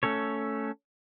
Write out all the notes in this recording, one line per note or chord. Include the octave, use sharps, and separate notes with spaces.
A3 C#4 A4 C#5